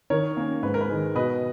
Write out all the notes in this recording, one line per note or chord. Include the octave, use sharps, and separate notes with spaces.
D#3 A#4 C#5
A#3 C#4
G#2 B4
A#4
B4
D#3 G#3
B2 B4 D#5